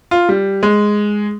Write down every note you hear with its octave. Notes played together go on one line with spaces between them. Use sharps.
F4
G3
G#3